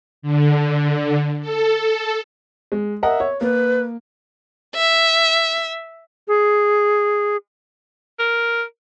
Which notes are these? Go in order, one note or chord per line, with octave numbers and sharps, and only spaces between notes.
D3
A4
G#3
A#4 D#5 E5 F#5
C#5
A#3 B4
E5
G#4
A#4